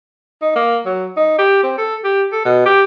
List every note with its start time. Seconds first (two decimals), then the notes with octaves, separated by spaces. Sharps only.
0.42 D#4
0.55 A#3
0.86 F#3
1.17 D#4
1.38 G4
1.63 C4
1.78 A4
2.04 G4
2.32 A4
2.45 B2
2.65 G4